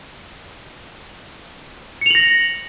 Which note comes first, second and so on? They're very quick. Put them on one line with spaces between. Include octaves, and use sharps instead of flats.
C#7 F7 F#7 A#6